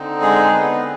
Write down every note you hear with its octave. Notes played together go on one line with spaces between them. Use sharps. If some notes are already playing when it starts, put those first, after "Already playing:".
Already playing: D3 C4 D#4
G#3 G#4
B3 B4